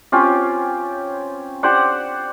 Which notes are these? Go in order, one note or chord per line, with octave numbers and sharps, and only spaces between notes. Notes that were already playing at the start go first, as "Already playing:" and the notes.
C4 C#4 F4 G4
G4 C5 D5 F#5